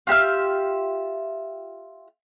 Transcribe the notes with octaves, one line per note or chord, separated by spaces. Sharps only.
F4 G4 E5 F6